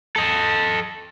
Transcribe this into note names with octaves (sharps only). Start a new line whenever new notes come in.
A4 D#5